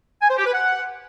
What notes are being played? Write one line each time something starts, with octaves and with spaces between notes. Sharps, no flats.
G#5
C5
G4
B4
F#5